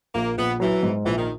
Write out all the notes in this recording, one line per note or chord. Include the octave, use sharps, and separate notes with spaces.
A#1 A#3
A#1 B3
E3 F#3
G#2
A#1 E3
D#3